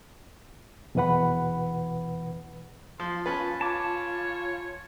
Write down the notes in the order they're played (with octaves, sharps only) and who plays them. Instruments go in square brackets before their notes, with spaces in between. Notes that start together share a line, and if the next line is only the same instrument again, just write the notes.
[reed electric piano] E2 B2 E3 B4 F#5 B5
[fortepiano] F3 [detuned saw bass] F4 [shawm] C6
[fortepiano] C#4 B4 [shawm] A5
[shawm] C#5 [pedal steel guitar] A5 D6